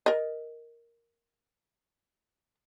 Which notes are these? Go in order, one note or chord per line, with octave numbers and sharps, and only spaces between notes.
A#4 D#5